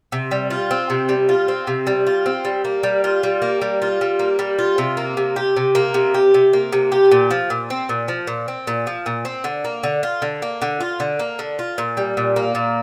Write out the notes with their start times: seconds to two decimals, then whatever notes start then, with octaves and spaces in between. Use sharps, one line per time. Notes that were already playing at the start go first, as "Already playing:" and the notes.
0.12 C3
0.31 G3
0.50 F4
0.71 C4
0.90 C3
1.09 G3
1.29 F4
1.48 C4
1.67 C3
1.87 G3
2.07 F4
2.26 C4
2.45 G3
2.65 A#3
2.83 G3
3.04 F4
3.23 G3
3.42 A#3
3.62 G3
3.82 F4
4.01 G3
4.19 A#3
4.39 G3
4.59 F4
4.78 C3
4.97 A#3
5.17 C3
5.36 G4
5.57 C3
5.75 A#3
5.94 C3
6.14 G4
6.34 C3
6.53 A#3
6.73 C3
6.92 G4
7.12 A#2
7.31 F3
7.50 A#2
7.70 C4
7.89 A#2
8.08 F3
8.27 A#2
8.48 C4
8.67 A#2
8.87 F3
9.06 A#2
9.25 C4
9.44 D3
9.65 A#3
9.83 D3
10.03 F4
10.22 D3
10.42 A#3
10.62 D3
10.81 F4
11.00 D3
11.19 A#3
11.39 D3
11.59 F4
11.78 A#2
11.97 G3
12.17 A#2
12.36 A#3
12.55 A#2